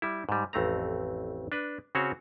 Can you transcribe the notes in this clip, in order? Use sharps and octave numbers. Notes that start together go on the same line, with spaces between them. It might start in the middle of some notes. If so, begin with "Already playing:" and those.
G3 E4
G#2 G3
A1 F2 A3 C4 A#5
D4 B4
C#3 C4 C#4 F#4 C#5